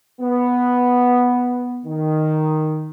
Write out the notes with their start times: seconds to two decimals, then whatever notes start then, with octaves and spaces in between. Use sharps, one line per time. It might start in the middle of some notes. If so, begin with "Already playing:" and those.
0.21 B3
1.86 D#3